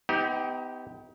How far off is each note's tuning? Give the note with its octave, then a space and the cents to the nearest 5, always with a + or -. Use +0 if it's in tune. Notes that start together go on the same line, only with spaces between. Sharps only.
B3 +35 D#4 +30 G4 +0